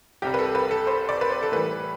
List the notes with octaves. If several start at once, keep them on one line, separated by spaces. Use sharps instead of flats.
C2 C3 G3 G4
B4
A4
B4
A4
C5
D5
B4
C5
A4
A2 E3 G3 B4